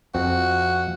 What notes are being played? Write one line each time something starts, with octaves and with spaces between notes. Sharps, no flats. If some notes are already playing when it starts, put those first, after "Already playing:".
F2 C4 F#4